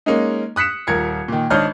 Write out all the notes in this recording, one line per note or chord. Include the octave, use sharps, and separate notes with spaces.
G#3 A#3 C#4 D#4
D#6 F#6 B6 C#7 E7
D#1 A#4 G#6 C#7
A#2 D#3
G#1 D4 C#5 D#5 F6 G6